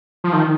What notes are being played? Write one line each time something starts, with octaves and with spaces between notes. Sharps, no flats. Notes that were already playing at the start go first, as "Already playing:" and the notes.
F3
D#3